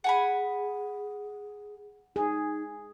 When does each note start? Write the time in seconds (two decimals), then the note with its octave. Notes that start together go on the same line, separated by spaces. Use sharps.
0.04 G#4 F#5 G#5 B5
2.16 D#4 G#4